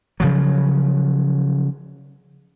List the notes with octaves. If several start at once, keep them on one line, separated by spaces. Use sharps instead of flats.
C#3 F3 F#3